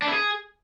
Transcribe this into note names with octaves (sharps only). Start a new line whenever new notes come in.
D4
E4
G#4